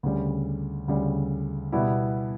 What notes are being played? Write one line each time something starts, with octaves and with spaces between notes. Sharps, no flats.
D2 C#3 G3
D2 C#3 G3
B2 G3 B3 E4